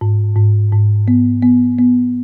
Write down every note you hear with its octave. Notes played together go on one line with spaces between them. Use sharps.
G#2
G#2
G#2
B3
B3
B3